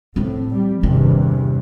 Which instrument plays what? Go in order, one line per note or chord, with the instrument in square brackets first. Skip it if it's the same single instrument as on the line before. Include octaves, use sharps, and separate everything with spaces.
[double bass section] A2 [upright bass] F3 C4
[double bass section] G3
[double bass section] E2 G2 C3 [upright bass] D#3